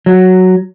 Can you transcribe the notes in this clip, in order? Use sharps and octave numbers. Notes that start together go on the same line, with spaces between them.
F#3